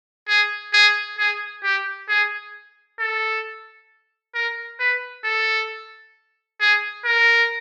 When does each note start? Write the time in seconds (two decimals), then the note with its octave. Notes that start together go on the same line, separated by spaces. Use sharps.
0.28 G#4
0.73 G#4
1.18 G#4
1.63 G4
2.08 G#4
2.99 A4
4.34 A#4
4.79 B4
5.24 A4
6.60 G#4
7.05 A#4